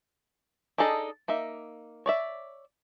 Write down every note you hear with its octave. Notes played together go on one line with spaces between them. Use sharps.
D4 D#4 G#4 A4 D#5
A#3 D#4 E5
C#5 D5 E5